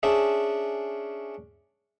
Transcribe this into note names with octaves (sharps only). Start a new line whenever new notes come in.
C#4 D4 G#4 E5